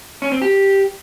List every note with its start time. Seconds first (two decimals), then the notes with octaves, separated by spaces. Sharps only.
0.22 C#4
0.32 C4
0.42 G4